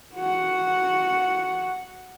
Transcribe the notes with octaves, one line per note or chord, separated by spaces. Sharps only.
F#4 F#5